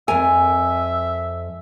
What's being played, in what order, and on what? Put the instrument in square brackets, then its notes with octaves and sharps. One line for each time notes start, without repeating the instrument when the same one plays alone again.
[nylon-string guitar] F2 A#4 [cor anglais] E5 [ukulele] G#5